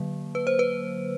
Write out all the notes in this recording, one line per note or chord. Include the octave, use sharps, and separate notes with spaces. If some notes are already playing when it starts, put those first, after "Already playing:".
Already playing: D3 F#3 A#3
B4
C5
B4